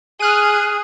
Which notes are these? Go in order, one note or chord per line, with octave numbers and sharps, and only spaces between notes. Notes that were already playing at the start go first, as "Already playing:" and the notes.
G#4 F6 F#6 D#7